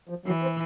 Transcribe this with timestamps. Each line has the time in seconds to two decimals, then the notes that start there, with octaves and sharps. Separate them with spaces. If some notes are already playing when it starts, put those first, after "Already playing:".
0.09 F3
0.26 E3 F#3
0.42 C4